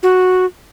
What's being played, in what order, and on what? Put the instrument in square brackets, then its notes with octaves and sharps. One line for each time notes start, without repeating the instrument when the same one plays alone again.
[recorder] F#4